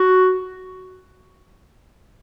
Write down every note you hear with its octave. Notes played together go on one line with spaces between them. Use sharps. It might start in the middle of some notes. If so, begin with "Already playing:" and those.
Already playing: F#4